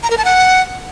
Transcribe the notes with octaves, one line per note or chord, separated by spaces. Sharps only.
A#5
A#4
A5
F#5